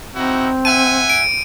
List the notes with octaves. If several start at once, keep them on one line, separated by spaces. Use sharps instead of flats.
C4 D#4 E4 F#4
E5 F#5 G#5 D#7
D7